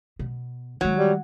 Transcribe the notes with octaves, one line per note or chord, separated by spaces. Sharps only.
B2
D#3 F#3 G#3
G3